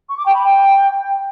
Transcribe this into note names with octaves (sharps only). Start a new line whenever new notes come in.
C#6
D6
G5
B5
G5